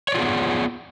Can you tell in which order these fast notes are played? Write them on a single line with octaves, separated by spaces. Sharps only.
C#5 D5 F4 G#4 B3